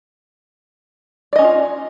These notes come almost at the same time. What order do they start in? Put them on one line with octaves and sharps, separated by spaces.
D5 D#5 C#4 D#4 F4